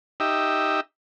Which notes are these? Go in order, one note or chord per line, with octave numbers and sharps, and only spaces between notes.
D#4 G4 E5